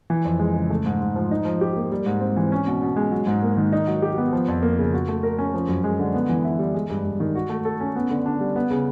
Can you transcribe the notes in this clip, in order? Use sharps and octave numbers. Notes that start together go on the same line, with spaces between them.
E3
F2
G#3
C#3
A3
G#2
G#2
F3
D#4
F3
G4
A#3
G3
G#2
C4
E3
C#4
B2
B2
G#3
F#3
G#2
A#3
D#3
D#4
F#3
G4
B3
F3
F2
A#3
C#3
F#4
A3
A#4
C#4
F3
F#2
G#3
D3
B3
E3
E4
G3
G#3
G2
G2
D#3
F#4
A3
A4
C#4
B3
D3
D4
G3
B3
C#3